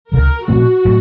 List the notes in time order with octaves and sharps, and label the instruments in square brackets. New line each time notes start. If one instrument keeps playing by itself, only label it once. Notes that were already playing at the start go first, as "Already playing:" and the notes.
[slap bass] C#2 C#3 F#3 [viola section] A#4
[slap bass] A#2 F3 A3 C4 [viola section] F#4
[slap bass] A2 F#3 A3